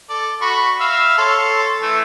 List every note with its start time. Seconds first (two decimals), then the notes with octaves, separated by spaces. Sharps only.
0.10 A4 D5
0.42 F#4 B5 C#6
0.80 E5 F5
1.18 A4 C#5 C6
1.82 E3 A3 E5